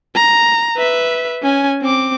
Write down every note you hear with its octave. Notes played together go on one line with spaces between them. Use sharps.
A#5
B4 E5
C#4 G#5
C4 D6